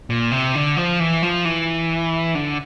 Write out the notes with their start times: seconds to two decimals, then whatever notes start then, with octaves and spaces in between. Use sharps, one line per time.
0.10 A#2
0.32 C3
0.55 D3
0.77 F3
1.00 E3
1.23 F3
1.45 E3
2.35 D3